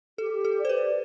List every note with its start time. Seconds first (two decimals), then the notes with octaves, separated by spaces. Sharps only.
0.18 G4 A4
0.45 A4
0.56 D5
0.65 C5
0.69 B4